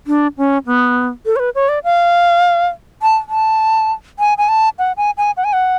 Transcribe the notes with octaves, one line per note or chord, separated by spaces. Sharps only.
D4
C#4
B3
A4
C#5
B4
C#5
D5
F5
A5
A5
G#5
G#5
A5
F#5
G#5
G#5
F#5
G#5
F#5